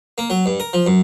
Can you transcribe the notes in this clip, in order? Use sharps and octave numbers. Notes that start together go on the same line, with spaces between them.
A#3
F#3
G2
A#4
F3
F#2